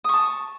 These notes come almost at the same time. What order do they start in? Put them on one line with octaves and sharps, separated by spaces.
D#6 C#6 A5